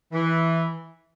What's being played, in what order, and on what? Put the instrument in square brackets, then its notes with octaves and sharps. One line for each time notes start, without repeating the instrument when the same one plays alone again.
[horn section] E3